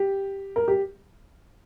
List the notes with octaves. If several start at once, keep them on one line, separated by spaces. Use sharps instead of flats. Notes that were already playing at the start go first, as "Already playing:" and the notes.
Already playing: G4
A#4
G4